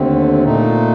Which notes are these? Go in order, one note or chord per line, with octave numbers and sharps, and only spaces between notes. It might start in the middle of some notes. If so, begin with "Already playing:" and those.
Already playing: D#2 D3 A3 C4
A#2 A3 D#4